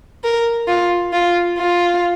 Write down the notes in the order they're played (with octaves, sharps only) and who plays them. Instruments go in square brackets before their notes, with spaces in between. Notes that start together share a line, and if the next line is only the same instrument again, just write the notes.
[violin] A#4
F4
F4
F4